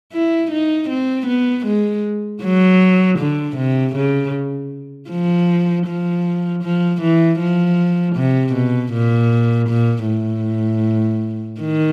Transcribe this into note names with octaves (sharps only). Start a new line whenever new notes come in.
E4
D#4
C4
B3
G#3
F#3
D3
C3
C#3
F3
F3
F3
E3
F3
C3
B2
A#2
A#2
A2
D#3